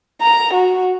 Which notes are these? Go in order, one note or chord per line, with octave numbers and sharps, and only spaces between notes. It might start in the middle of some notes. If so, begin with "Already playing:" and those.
A#5
F#4